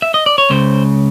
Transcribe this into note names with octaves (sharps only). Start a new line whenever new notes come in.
E5
D#5
D5
C#5
C#2 C#3 C5